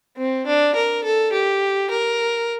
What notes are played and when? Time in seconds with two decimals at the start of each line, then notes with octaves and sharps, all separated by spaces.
0.17 C4
0.47 D4
0.76 A#4
1.04 A4
1.33 G4
1.91 A#4